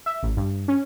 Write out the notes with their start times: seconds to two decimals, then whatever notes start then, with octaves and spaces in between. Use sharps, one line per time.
0.06 E5
0.23 A1
0.37 G2
0.68 C#4